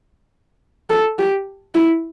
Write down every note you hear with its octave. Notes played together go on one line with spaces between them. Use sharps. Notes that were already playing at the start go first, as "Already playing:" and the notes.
A4
G4
E4